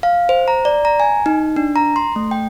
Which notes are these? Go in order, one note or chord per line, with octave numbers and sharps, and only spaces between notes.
F5
C5
A#5
D5
A#5
G#5
D#4
D4
A#5
C6
A3
G5